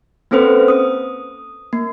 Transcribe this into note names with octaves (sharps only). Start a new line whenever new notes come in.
A#3 C4 C#4 A4 B4 C5
D#6
A#3